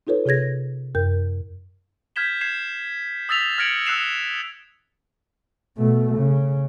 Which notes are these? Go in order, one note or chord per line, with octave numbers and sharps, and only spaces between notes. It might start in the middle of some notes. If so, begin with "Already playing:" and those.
D#4 F4 A4 B4 C#5
C3 G#4 C#5 G#6 A#6
F#2 A#4 G6
F6 G6 G#6 B6 E7 G7
G6 G#6 C7 E7
D#6 E6 A6 B6 F7
F6 G#6 A#6 C#7 D7 F#7
E6 F#6 C7 E7 F7
B2 A3
C#3